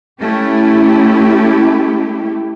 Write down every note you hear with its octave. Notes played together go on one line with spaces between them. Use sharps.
A3 C#4 E4 G4